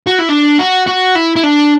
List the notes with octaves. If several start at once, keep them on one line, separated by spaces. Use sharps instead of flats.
F#4
E4
D4
F#4
F#4
E4
E4
D4